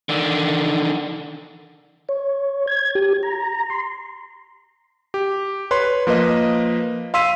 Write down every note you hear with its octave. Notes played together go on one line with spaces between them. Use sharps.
D3 D#3
C#5
G#6
G4
A#5
C6
G4
B4 C#5 C6
F3 A#3 B4 D#5
F5 C6 E6 B6 D#7